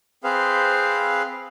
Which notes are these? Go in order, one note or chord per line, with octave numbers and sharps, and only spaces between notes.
C4 G#4 B4 C5 F5